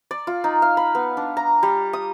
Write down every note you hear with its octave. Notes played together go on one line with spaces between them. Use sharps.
D5
F4
D#4
F5
B5
B3
D4
A#5
G3
D#6